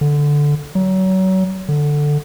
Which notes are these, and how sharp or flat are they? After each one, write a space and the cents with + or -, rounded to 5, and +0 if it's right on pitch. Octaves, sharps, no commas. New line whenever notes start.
D3 -5
F#3 +30
D3 +5